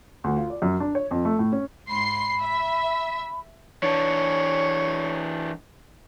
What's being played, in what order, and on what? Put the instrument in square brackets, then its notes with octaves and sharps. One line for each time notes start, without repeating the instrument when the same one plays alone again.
[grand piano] D2
F4
D5
F#2
D4
C#5
F2
A3
A2
C#4
[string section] G#2 C6 C7 [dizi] B5
[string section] E5
[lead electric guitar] E3 D4 [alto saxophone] C#5